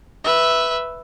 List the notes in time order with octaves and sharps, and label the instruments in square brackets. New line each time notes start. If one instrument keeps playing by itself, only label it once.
[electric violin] B4 E5